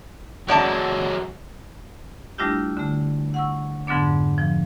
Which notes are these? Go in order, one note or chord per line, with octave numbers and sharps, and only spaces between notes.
F#2 F#3 G#3 D5 A5
G3 A3 D4 E4 F4 G4
D3 A3
F#5 C#6 E6
F2 G#2 D3 F#3 B3 D4
F3